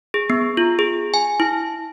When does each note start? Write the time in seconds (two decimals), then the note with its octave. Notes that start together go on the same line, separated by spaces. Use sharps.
0.14 G#4
0.30 B3
0.57 F4
0.79 G#4
1.14 G#5
1.40 E4